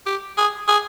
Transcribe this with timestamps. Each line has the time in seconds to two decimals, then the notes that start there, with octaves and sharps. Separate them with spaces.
0.06 G4
0.38 G#4
0.68 G#4